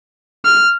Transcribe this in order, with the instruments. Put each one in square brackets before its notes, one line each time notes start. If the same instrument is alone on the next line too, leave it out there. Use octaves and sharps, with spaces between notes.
[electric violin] F6